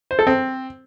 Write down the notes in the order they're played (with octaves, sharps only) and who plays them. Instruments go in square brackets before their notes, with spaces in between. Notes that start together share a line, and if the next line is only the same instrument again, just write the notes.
[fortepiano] C5
A4
C4